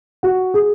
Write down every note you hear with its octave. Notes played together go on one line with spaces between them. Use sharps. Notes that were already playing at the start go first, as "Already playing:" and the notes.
F#4
G#4